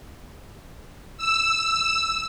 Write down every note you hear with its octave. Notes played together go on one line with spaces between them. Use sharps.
E6